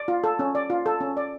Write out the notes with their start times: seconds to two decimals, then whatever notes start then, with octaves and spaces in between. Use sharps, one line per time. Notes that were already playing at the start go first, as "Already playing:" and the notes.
Already playing: D5
0.08 F4
0.24 A4
0.39 C#4
0.55 D5
0.70 F4
0.86 A4
1.00 C#4
1.17 D5